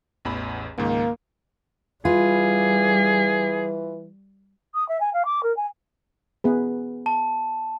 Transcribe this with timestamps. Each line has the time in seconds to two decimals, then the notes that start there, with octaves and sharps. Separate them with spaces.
0.25 A1 E2 B5
0.78 C#2 G#2 D#3 A#3
2.05 E3 G3 F4 G#4 B4
4.74 D#6
4.89 E5
5.01 G#5
5.13 F5
5.25 D6
5.43 A#4
5.57 G#5
6.44 B3 G#4 B4
7.06 A5